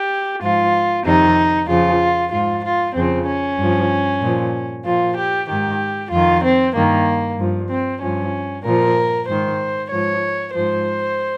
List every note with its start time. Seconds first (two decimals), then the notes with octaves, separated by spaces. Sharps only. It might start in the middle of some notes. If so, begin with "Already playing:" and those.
Already playing: G4
0.42 G#2 F3 F4
1.05 F2 C3 D#3 D#4
1.68 F2 C#3 F3 F4
2.32 G#2 F3 F4
2.64 F4
2.95 F2 C#3 F3 C4
3.26 C#4
3.58 G2 F3
4.22 A#2 F3
4.85 A#2 F3 F4
5.17 G4
5.48 G#2 D#3 G4
6.11 F2 D#3 F4
6.43 C4
6.74 G2 D#3 A#3
7.38 G2 F3
7.69 C4
8.02 G2 F3 C#4
8.65 A#2 F3 A#4
9.28 G#2 D#3 C5
9.91 G#2 F3 C#5
10.55 G#2 F3 C5